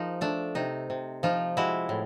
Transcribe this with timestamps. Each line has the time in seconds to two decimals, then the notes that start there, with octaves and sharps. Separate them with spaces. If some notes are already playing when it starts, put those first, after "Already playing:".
Already playing: F3 D#4 G#4 A#4
0.21 A3 D4
0.55 C3 D#4
0.90 C3
1.23 F3 D#4 F4
1.57 G#3 E4 F#4
1.89 A2